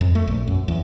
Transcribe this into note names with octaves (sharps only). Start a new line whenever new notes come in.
F2
A3
A#1
F#2
E2